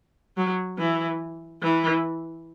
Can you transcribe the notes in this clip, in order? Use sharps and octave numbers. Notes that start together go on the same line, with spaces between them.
F#3
E3
E3